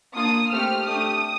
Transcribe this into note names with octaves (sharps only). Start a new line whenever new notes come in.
A#3 D4 F4 D#6
A3 C4 G4 F6
A3 D4 G4 D#6